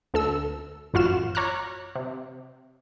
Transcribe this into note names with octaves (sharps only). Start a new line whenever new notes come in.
D2 A4 E6
A1 F#2 F4 F#4 F6 E7
C#5 A#5 D6 F6 F#6
C3